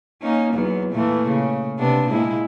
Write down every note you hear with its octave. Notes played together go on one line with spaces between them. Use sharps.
A#3 C#4 D#4
E2 F#3 B3
A#2 E3 A3
C#3
C3 B3 D4
A#2 G#3 E4